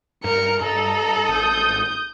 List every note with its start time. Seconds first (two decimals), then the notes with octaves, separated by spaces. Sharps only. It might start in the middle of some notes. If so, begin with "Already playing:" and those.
0.24 G2 A#4 C#7
0.61 G2 A4 D#5 A#5
1.28 G#1 D#6 G6